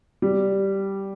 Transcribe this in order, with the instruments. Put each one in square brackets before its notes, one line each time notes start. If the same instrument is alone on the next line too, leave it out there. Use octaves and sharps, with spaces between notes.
[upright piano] G3